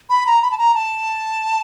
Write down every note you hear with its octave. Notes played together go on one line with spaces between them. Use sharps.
B5
A#5
B5
A5
A#5
A5